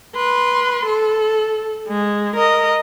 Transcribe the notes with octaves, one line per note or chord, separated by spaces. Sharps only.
B4 C6
A4
G#3
A#4 D#5